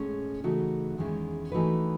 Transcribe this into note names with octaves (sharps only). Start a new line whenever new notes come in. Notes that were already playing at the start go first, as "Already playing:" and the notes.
Already playing: A2 G#3 C#4 G#4
C#3 E3 A3 D#4 F#4
E2 D#3 G#3 C#4 E4
E3 A3 D#4 F#4 B4